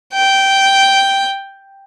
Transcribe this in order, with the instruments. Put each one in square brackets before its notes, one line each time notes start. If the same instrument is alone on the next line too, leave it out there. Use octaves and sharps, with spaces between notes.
[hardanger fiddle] G5